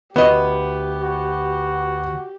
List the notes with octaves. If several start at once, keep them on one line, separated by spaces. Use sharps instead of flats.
D2 B3 G4 D#5
F#4